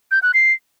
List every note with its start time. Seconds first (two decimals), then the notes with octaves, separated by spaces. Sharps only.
0.11 G6
0.23 F#6
0.34 C7